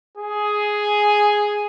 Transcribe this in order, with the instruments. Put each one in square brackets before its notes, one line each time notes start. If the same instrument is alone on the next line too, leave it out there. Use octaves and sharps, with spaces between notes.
[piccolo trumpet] G#4